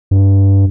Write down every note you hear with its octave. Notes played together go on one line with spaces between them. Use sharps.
G2